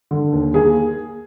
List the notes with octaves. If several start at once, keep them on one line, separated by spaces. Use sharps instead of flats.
D3
D#2
A#3 G#4